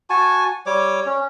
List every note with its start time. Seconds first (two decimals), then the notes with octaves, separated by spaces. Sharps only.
0.10 F#4 G#5 A5 C#6
0.66 G3 C#5 D6
1.06 C#4